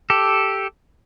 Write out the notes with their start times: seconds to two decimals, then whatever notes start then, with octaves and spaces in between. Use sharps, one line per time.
0.10 G4 A4